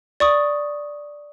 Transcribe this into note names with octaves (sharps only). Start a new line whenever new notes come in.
D5 C#6 D#6